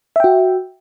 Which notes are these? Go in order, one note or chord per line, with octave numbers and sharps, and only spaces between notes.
F#4 E5 G5